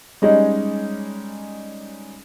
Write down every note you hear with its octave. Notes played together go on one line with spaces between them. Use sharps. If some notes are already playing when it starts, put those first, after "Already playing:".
G3 G#3 C#4 D#4